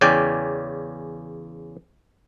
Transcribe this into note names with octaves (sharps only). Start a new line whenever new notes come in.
E2 C#3 C#4 D5 G5